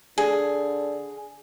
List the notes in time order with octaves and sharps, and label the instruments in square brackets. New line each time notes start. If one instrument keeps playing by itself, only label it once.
[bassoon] D3 [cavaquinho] G#4